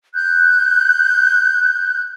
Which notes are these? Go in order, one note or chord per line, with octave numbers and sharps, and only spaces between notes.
F#6 G6